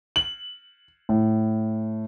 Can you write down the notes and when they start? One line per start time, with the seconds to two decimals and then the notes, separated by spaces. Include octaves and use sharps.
0.16 F#7
1.09 A2